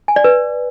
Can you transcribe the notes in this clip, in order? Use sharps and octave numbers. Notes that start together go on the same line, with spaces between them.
G#5
D5
B4